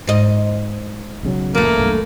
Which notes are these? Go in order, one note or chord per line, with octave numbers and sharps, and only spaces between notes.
G#2 D#5
B1 C#3 F#3
E2 A3 A#3
B1 G2